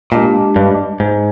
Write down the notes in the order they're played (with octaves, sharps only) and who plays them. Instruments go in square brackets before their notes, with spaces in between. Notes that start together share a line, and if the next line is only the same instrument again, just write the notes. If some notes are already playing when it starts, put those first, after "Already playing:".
[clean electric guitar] A#2 [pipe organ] G#3 D4 G4
[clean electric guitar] G2
G#2